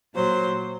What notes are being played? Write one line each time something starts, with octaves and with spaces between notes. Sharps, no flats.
A#2 F#3 C5